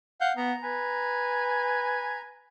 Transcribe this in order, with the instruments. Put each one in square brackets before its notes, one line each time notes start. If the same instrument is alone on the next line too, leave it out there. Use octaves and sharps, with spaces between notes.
[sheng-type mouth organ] F5 F#5 G6
[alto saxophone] B3 [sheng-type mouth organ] A#5
[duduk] B4 [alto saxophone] G#5